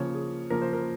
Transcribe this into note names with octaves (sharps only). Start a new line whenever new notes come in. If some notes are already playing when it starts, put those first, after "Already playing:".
Already playing: C#3 F3 A#3 C#5
G#4
C#3 F3 A#3 A#4
C5
A#4